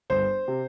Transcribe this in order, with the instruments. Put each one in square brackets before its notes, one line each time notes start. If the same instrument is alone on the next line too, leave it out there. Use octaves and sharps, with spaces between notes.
[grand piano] G1 C5
C3